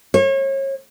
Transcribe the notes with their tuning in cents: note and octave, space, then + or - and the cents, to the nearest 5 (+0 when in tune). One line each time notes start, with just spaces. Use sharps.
C#5 -35